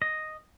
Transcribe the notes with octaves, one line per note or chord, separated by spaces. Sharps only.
D#5